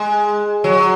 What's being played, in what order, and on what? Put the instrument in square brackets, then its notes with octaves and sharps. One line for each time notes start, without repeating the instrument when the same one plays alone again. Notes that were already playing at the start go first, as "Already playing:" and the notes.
Already playing: [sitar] G#3
F#3